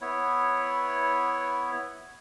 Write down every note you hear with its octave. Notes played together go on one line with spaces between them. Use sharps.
B3 E4 C#5